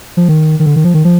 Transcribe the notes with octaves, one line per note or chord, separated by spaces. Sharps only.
F3
D#3
D#3
D3
D#3
F3
D#3
F3